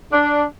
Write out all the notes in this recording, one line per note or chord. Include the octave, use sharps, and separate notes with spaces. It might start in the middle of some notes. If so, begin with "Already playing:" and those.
D4